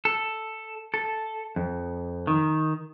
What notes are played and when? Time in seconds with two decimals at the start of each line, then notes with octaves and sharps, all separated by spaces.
0.05 A4
0.94 A4
1.56 F2
2.27 D#3